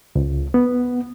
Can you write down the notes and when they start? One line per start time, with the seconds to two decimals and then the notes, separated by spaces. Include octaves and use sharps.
0.16 C#2
0.54 B3